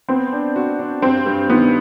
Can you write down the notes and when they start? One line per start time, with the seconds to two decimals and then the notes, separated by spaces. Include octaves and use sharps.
0.09 B3 C4
0.32 D4
0.56 F#4
0.79 D4
1.02 G2 C4
1.26 G2
1.50 D#3 B3